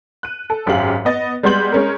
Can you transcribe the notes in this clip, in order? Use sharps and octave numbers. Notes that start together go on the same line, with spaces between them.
F#6 D#7
A4
G#1 F#2 G4 G#4 F5 F#7
B3 D#5 A6
G3 G#3 B3 C6 G6 F#7
G#3 C#4 A#4